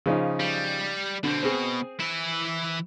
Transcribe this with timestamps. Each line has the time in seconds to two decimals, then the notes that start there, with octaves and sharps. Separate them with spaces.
0.06 C#3 F3 D#4
0.40 G3
1.23 B2 D3 C4
1.42 B2 C4 G#4
2.00 E3 E4